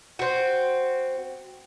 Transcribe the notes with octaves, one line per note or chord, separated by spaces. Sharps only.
C4 F#4